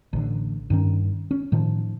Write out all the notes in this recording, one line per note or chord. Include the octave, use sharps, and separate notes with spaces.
A1 D3
G2 D#3 C#4
C#4
A2 D#3 F3